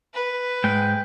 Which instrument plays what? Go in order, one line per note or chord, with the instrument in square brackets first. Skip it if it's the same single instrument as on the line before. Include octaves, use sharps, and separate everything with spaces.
[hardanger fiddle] B4
[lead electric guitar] G#2 G#3 [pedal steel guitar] G5